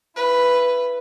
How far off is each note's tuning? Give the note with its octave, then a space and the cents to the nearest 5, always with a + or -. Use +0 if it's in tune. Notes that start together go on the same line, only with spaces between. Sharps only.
E4 +30 B4 +0